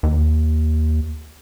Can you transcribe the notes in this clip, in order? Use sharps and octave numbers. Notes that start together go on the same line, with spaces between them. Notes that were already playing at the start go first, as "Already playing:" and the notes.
D#2